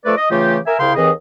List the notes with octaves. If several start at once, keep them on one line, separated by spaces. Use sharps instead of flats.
F3 A3 A4 B4 D5
D#5
C#3 E3 A3 F4 G4
A#4 E5 G#5
C2 C#3 E4 F5 G5 C6
D#2 E3 C4 G#4 D#5